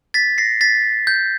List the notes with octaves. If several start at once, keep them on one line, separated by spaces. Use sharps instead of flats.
A6 B6
A#6 C7
A6 B6
G6